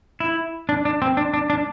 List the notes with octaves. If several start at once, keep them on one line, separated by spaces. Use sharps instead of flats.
E4
D4
D4
C4
D4
D4
D4